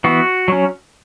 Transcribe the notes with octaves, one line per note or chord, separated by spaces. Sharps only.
E3 B3 F#4
F#3 C#4